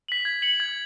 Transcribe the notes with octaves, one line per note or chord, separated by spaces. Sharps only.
B6 F#7
G#6
C#7 F#7
G#6